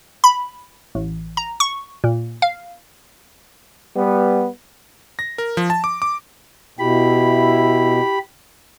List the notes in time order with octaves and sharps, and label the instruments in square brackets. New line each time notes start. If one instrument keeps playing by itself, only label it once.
[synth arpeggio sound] B5
A1
A#5
C#6
A#2
F5
[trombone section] G3 B3
[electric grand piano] A#6
A#4
F3
A5
D6
D6
[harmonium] B2 [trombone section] E4 [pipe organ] G4 B5